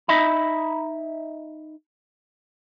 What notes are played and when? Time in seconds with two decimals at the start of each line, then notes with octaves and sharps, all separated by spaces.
0.08 D#4 D#5 E5 B5